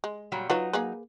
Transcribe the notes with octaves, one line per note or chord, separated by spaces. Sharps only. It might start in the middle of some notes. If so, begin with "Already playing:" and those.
G#3
A#2 F#3 G3
F#3 D#4 F4 B4 C#5
A#3 G#4 B4